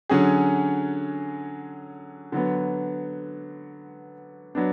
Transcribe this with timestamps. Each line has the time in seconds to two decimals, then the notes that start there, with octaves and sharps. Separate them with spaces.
0.09 D3 F#3 C#4 G#4
2.32 D3 F#3 B3
4.55 F#3 B3 D4